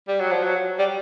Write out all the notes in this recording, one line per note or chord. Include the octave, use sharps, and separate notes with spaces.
G3
F#3
F3
F#3
G3